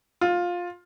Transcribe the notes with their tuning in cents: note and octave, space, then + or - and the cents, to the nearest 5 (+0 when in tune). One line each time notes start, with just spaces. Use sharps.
F4 +15